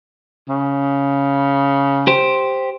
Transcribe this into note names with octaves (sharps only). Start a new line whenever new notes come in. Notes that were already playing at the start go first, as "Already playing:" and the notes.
C#3
G4 C5